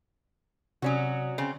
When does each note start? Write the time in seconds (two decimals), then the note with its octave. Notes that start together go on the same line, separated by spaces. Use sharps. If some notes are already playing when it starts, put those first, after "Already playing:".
0.82 C3 F#3 C#4 F#4 D5 D#6
1.38 C#3 C4